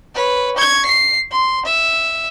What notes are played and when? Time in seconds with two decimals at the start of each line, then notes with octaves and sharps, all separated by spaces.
0.15 B4 C#5
0.56 C#6 G#6
0.86 C7
1.31 C6
1.65 E5